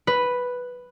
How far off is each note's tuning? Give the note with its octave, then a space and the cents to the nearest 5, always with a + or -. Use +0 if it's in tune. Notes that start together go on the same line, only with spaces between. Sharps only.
B4 +0